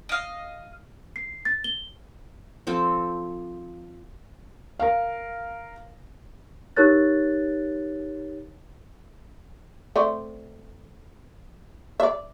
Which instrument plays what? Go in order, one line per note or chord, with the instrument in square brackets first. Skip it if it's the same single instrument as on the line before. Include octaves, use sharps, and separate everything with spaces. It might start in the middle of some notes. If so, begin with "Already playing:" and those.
[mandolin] D#5 F5
[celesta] C7
A6
G7
[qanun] F3 C4 A4
[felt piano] A#4 F5
[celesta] D#4 G4 A#4 C#5 F#6 A6
[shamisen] A3 C4 D5
D5 E5